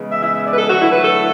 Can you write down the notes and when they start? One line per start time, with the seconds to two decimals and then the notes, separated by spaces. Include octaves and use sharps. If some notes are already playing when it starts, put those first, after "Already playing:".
Already playing: C#3 E3 G#3 B3
0.11 E5
0.22 E5
0.34 E5
0.46 D5
0.53 B4
0.58 A4
0.68 D3 F#3 A3 F#4
0.80 E4
0.92 B4
1.03 A4